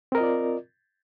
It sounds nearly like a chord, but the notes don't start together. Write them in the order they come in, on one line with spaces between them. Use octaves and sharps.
C4 A#4 D#5 F4 D5